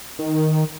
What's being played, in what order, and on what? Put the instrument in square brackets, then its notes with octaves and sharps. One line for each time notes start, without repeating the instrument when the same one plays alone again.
[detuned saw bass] D#3